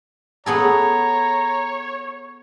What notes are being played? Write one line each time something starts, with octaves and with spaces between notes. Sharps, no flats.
B3 G#4 A4 C#5 A#5